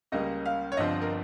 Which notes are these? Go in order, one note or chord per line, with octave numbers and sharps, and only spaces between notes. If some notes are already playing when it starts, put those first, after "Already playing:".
C#2 C#3 G3 A#3 C#4 D#5
F5
C#5
G1 G2 F3 C4 D#5
A#4